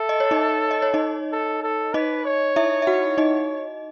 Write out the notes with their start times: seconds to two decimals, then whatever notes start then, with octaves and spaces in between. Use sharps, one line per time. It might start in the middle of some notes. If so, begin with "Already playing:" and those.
Already playing: A4 E5
0.09 D#5
0.20 C#5
0.31 D#4 D#5
0.71 D#5
0.82 C#5
0.94 D#4 D#5
1.32 A4
1.63 A4
1.94 D#4 B4 D#5
2.25 C#5
2.56 E4 E5
2.82 E5
2.87 F#4 F#5
3.18 D#4 D#5